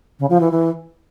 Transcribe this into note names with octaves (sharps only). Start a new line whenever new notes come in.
C#3
F3
E3
E3